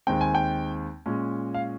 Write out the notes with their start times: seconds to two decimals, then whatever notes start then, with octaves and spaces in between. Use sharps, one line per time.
0.07 D#2 D#3 G#3 C4 G5
0.21 G#5
0.35 G5
1.06 A#2 G#3 C#4
1.54 F5